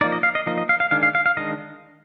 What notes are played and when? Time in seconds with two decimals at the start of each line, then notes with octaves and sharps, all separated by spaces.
0.01 F3 A#3 D#4 D5
0.12 D#5
0.23 F5
0.35 D#5
0.46 F3 A#3 D#4 D#5
0.58 D#5
0.69 F5
0.80 F5
0.91 D#3 G#3 D4 F5
1.03 F5
1.15 F5
1.26 F5
1.37 D#3 G#3 D4 D#5